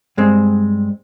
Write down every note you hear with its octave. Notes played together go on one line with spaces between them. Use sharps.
G2 G#3 C4